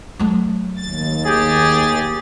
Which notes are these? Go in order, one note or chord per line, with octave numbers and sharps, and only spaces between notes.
F#3 A3
D#2 A6
G4 G#4